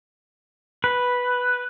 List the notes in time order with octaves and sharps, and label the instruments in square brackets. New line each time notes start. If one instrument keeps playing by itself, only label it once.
[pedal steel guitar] B4